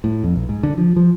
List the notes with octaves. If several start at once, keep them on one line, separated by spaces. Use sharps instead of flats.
A2
F2
B1
G#2
D3
F3
F3